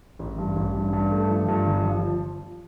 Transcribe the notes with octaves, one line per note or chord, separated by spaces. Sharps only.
A1
G2
A1
G2
G2
A3
F3
G2
G1
F3